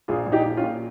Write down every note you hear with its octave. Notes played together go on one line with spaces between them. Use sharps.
A#1 F4 G#4
A#1
D#4 G4
A#1
C#4 F4
A#2